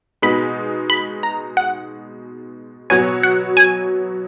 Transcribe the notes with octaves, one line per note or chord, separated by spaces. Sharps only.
B2 G#3 B3 D#4 B5
B5
A#5
F#5
B2 F#3 B3 F#4 C#5 G#5
F#5
G#5